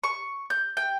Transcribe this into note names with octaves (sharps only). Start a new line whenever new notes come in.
C#6
G6
G5